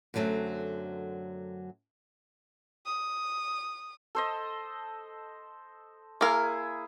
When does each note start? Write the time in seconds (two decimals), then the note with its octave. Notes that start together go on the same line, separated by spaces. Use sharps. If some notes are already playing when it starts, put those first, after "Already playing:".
0.14 F#2 D3 F#3 A3 C4
2.86 D#6
4.15 A4 C5 D#5
6.21 A#3 E4 G#4 A#4